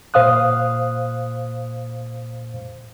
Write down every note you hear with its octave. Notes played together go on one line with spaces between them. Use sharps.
A#2 C5 F5 D#6 F#6